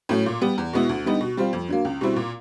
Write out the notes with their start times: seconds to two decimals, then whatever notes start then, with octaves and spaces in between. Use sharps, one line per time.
0.09 A2 F#3 A3 C#4
0.26 A#2
0.41 G3 B3
0.58 E2
0.73 B2 G#3 B3 E4
0.89 D2
1.05 D3 G3 B3 D#4
1.21 B2
1.37 G3 C4 F4
1.53 F2
1.68 D3 F#3 A#3
1.85 C#2
2.01 B2 G3 C4 E4
2.16 A#2